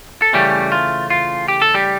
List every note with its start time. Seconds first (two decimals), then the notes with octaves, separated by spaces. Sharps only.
0.22 A4
0.33 C#3 E3 G3 A3 C#4 G4
0.72 F4
1.10 F4
1.48 G4
1.62 A4
1.74 G3 G4